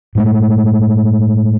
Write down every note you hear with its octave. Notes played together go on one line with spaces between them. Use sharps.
A2 G#3 A3